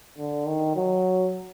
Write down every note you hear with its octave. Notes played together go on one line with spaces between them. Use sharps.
D3
D#3
F#3